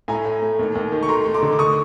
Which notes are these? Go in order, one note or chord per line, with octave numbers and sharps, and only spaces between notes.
A2 G#5 A#5
A2
A3
D#2
D#2
D#3
C#6
A3 A#5 C6
A3
C6 D6
D3
D6
C#6 D#6